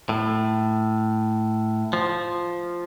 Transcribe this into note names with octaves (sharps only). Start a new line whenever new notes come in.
A2
F3